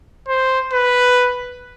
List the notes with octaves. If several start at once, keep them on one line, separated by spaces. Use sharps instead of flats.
C5
B4